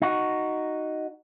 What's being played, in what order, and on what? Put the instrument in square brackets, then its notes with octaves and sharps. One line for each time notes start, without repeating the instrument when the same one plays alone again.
[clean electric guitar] D#4 F#4